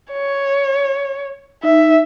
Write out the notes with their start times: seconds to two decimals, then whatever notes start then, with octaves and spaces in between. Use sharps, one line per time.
0.12 C#5
1.63 D#4 E5